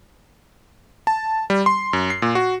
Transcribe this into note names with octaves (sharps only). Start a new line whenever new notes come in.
A5
G3
C6
F#2
C7
A#2
F#4